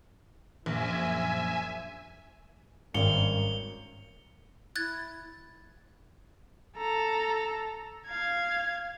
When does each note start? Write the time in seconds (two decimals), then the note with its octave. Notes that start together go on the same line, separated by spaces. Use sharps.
0.66 A#1 F#2 F3 E5 G#5
2.94 G#1 G2 C#4 A#4 F5 C#7 F7 G7
4.76 E4 F#6 G#6 A6
6.77 A4 A#5
8.07 F5 G#6